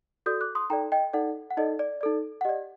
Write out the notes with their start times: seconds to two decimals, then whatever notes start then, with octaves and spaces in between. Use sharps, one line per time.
0.26 F#4 A4 D5 D#6 G6
0.41 D6 F#6
0.55 C6 D#6
0.70 D#4 A4 D5 G5 A#5
0.92 D#5 G5
1.13 D#4 A4 D5 F#5
1.50 F#5
1.57 D#4 A4 D5 D#5
1.79 D5
2.01 D#4 A4 D5
2.41 F#5
2.45 G4 D#5
2.49 D5